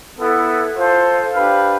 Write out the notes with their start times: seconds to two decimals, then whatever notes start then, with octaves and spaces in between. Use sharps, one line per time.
0.19 B3 E4 A4
0.77 F4 A4 C5
1.34 D4 G4 B4 F5